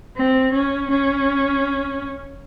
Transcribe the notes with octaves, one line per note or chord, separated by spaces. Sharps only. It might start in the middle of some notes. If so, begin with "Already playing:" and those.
C4
C#4
C#4